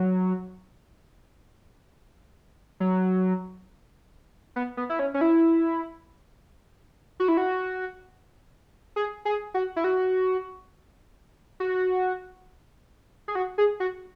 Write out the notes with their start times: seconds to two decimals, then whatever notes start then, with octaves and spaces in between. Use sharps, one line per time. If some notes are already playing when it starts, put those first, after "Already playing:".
Already playing: F#3
2.80 F#3
4.56 B3
4.77 B3
4.90 E4
4.99 C#4
5.14 C#4
5.21 E4
7.20 F#4
7.28 E4
7.37 F#4
8.96 G#4
9.25 G#4
9.54 F#4
9.76 E4
9.84 F#4
11.60 F#4
13.28 G#4
13.35 F#4
13.58 G#4
13.80 F#4